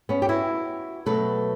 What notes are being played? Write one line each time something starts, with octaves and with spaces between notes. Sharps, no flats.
B3 C#4
G4
E4 F#4
B2 F#3 A3 A4 B4